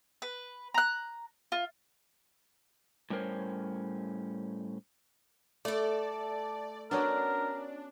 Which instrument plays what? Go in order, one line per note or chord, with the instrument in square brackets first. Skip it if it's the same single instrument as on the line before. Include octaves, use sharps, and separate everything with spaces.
[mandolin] B4
A#5 F#6
F4
[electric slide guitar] A2 G3 C#4 A#4 C5 C#5
[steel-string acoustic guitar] A3 A4 [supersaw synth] D5
[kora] B3 C#4 F#4 [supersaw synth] D4 [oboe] A#4